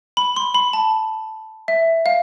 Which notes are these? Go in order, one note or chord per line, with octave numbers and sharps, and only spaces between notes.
B5
C6
B5
A5
E5
F5